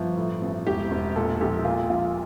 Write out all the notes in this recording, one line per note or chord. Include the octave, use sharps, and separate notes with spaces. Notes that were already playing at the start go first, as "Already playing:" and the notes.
Already playing: G1 F3
A2
A1
E1 G4
E1
A#2 A4
A4
A#1 G4
A#2 F4
A#1 F4